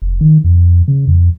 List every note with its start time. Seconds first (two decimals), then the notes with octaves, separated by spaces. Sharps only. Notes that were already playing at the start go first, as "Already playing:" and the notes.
0.02 F1
0.21 D#3
0.44 F2
0.88 C#3
1.07 F2